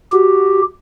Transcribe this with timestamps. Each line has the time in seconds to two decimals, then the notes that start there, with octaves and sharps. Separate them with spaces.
0.13 F#4 G4